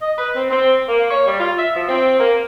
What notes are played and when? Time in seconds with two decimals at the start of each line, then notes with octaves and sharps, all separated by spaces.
0.02 D#5
0.18 B4
0.36 C4
0.50 C4
0.89 A#3
1.10 C#5
1.27 G3
1.40 F4
1.58 E5
1.76 F3
1.89 C4
2.20 A#3